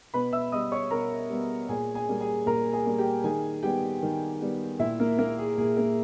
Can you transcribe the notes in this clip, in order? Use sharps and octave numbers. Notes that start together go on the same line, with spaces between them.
B2 B4 B5
E5 E6
G3 B3 D#5 D#6
C#5 C#6
B2 A#4 A#5
G3 B3
A#2 G#4 G#5
G#4 G#5
G3 A#3
G#4 G#5
A#2 A#4 A#5
G#4 G#5
G3 A#3
G4 G5
D#3 G#4 G#5
G3 B3 G4 G5
D#3
G3 B3
A#2 E4 E5
A#3 A#4
A#3 A#4
G#4
A#2 G#4
A#3 A#4